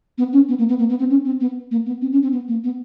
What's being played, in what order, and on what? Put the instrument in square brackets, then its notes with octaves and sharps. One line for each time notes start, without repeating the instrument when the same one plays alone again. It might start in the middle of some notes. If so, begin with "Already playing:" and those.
[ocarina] B3
C#4
B3
A#3
B3
A#3
B3
C4
C#4
C4
B3
A#3
B3
C4
C#4
C4
B3
A#3
B3